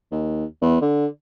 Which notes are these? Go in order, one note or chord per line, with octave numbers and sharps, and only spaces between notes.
D#2
E2
D3